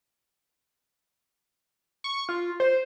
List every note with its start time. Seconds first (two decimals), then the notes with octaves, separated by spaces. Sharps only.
2.04 C#6
2.29 F4
2.60 C5